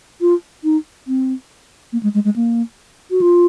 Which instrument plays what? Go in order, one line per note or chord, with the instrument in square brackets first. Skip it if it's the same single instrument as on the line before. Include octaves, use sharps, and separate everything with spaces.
[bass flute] F4
D#4
C4
A#3
G#3
G#3
G#3
A#3
F#4
F4